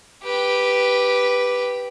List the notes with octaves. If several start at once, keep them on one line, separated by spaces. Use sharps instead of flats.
G4 B4